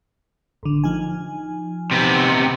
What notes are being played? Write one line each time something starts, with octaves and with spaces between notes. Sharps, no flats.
A1 D3
F3 D#4 G#5
C3 B3